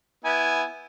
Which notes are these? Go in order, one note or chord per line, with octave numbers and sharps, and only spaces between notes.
B3 E4 G#5